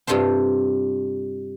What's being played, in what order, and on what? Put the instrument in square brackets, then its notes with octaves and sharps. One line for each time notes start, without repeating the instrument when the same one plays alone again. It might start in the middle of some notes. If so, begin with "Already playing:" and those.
[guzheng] G2 C3 F4 A4 C5